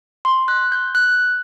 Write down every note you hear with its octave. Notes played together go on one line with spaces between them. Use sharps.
C6
F#6
G6
F#6